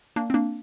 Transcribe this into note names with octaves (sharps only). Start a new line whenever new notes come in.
A#3 D4
C4
A#3 D4